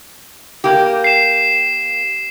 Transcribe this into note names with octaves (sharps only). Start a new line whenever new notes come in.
A#3 G4
C7 E7